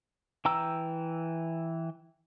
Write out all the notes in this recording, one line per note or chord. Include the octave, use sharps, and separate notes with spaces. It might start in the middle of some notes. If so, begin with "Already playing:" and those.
E3 G5 A#5 E6